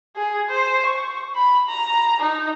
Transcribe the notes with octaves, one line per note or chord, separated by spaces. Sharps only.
G#4
C5
C#6
B5
A#5
D#4